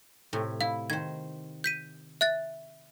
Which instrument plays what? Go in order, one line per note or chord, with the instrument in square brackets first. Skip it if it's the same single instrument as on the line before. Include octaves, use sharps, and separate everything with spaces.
[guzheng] A2 C3
[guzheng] E4 [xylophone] F5
[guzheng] D#3 C5 [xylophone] G#6
[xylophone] G6 B6 D#7
E5 F#6 A6